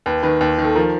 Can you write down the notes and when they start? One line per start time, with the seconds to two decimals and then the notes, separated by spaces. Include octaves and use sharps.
0.06 D#2 B4
0.23 D#3 B4
0.41 D#2
0.58 D#3
0.64 A4
0.75 F3 A#4